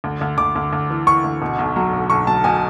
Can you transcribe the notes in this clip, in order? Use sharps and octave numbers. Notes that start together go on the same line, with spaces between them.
D2
D2
D2 D6
D2
D2
E3
E3 C#6
D2
B2
B1
F#3
B1
B1 C#6
F#3 A5
B2 G#5